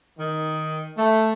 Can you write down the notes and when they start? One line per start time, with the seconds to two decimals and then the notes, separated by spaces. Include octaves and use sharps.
0.17 D#3
0.96 A3